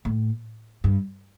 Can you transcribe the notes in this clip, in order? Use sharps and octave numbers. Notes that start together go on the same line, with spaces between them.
A2
G2